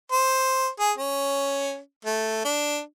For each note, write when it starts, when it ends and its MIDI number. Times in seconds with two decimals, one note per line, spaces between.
0.12 0.69 72
0.80 0.91 68
0.98 1.78 61
2.05 2.42 57
2.44 2.80 62